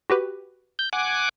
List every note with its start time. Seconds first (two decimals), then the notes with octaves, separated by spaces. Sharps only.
0.10 F#4 G4 B4
0.79 G6
0.93 F#5 G#5 D6